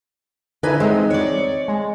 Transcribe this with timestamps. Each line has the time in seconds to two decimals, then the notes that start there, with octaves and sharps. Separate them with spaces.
0.63 D3 D#4 E4 B4 G#5
0.80 G#3 C4 D#4
1.10 C#5 D5
1.68 G#3